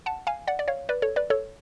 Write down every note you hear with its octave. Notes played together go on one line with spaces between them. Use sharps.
F#5 A5
F5 G#5
D5 F#5
D5
C#5 F5
B4 D5
A4 C#5
B4 D5
A4 C#5